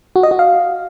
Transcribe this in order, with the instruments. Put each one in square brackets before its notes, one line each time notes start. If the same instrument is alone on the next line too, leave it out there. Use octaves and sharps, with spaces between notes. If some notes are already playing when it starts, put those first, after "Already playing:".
[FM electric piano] F#4
D#5
F#4
F5